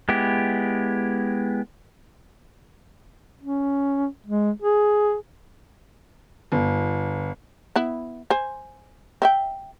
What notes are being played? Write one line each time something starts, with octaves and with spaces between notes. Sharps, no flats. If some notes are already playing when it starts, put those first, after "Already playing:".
G#3 B3 E4 G4
C#4
G#3
G#4
G1
B3 E4
C5 G#5
C4 E5 G5